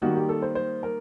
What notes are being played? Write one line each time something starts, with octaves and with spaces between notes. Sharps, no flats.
D#3 G3 A#3 F#4
G4
A4
C5
C5
A#4